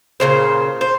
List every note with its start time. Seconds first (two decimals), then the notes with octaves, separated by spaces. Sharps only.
0.20 A#2 C#3 C5
0.81 C5